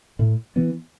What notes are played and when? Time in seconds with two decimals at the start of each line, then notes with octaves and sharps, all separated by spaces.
0.19 A2
0.56 E3 B3